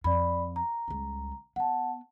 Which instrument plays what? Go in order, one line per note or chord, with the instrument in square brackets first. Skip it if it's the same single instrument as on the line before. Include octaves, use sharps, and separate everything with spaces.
[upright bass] F2 [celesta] D5 B5
[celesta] A#5
[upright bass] C#2 G3
[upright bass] B3 [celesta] F#5 A5